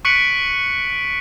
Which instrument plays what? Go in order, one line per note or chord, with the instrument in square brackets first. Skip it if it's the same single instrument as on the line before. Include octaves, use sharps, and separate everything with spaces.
[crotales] C#6 F#6 B6 C#7 D7 F#7